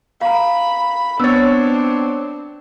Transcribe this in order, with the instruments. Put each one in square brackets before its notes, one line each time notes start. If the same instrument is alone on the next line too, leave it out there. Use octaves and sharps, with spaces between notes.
[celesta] F5 A#5 [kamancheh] B5
[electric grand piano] B3 C#5 [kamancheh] C4 D4 [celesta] E6 A6